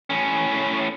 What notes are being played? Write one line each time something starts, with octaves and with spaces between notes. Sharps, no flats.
A2 C#4